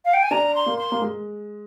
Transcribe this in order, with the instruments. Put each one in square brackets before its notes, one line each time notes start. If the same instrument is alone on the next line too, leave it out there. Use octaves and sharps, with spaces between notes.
[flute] F5
G5
G#5
[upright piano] D4 [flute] A#5
[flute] C6
[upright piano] A#3
[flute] C6
[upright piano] A#3
G#3